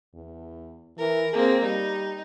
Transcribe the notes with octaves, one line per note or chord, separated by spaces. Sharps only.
E2
E3 A#4
A#3 C4 G#4
G3 D#4